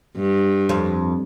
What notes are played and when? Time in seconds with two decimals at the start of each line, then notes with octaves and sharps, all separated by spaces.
0.16 G2
0.69 F2